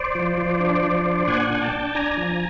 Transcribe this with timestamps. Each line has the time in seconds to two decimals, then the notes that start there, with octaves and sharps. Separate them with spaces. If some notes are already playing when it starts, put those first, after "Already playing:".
Already playing: C5 D5
0.15 F3
0.37 F3
0.60 D4
0.83 F3
1.06 D4
1.27 A#2 F#5 G#5
1.50 D4
1.61 G5 A5
1.73 D4
1.95 D4 G#5 A#5
2.17 F3